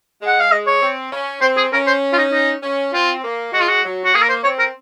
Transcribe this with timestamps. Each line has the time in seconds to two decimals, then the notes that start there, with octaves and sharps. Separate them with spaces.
0.21 G#3
0.27 F#5
0.40 F5
0.51 G#3 D#5
0.67 C#5
0.82 C4
1.12 C#4
1.41 C4 C5
1.57 G#4
1.73 C#4 A#4
1.87 C5
2.13 F4
2.18 D#4
2.32 D#4
2.63 C#4
2.93 C4 F4
3.23 A#3
3.53 G#3 F#4
3.61 F4
3.68 F#4
3.84 F#3
4.05 F#4
4.14 A#3 G#4
4.22 A#4
4.29 C5
4.44 C4 C#5
4.59 A#4